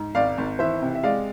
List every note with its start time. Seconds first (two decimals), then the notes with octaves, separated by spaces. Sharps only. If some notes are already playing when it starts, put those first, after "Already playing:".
Already playing: G#2
0.15 G#1 D5 F5
0.38 G#1
0.59 E3 C5 E5
0.82 C3
0.95 E5
1.03 G#3 D5 F5